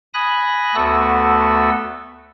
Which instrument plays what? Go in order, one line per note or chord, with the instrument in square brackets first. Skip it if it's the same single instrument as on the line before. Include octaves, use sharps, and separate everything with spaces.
[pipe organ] G#5 B5 D#6 F#6 A#6
D2 A3 B3 F#4 A4 E6